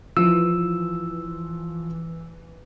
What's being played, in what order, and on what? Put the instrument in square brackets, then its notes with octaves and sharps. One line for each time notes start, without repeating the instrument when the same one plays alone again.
[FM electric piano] E3 [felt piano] F3 E4 [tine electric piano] E6